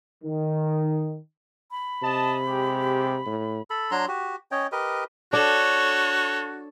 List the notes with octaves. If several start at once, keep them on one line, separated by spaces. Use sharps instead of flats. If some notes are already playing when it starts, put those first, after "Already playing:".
D#3
B5
C3 D#5 A5
G#3 G4
A2
A4 B5
F#3 D4 A#5 C6
F#4 G4
C#4 C#5 D#5 G5
G4 A#4 B4 D#5
D4 F#4 A4 C#5 F#5